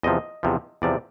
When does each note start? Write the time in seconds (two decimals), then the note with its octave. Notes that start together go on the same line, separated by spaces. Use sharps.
0.03 E2 C3 F3 D#5
0.43 E2 C3 F3
0.82 E2 C3 F3 D5